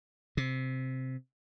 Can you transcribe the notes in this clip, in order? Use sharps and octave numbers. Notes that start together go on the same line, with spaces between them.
C3